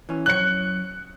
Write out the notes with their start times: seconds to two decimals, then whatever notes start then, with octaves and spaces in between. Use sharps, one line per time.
0.09 E3 C#4
0.26 F#2 C#5 F#6 C#7